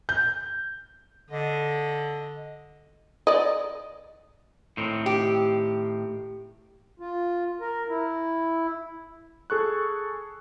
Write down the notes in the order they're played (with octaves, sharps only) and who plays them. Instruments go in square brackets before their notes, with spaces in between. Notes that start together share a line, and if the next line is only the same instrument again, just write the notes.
[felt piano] G6
[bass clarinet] D3 [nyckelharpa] D#5
[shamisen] D5 D#5
[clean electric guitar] A2 D#3 C4
[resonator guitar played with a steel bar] G4
[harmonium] F4
A#4
E4
[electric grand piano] G#4 A4 C#6 F#6